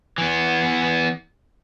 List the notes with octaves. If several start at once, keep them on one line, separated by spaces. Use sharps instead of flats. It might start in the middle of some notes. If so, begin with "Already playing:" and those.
E3 B3